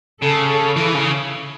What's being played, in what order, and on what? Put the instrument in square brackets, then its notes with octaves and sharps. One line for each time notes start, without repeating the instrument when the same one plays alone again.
[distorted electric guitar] C#3 [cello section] A4
[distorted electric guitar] E3
C#3